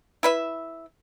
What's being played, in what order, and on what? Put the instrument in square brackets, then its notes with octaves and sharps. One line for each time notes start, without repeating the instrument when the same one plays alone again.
[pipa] E4 B4 E5